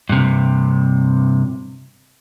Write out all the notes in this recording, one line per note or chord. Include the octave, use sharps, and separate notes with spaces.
G2 C3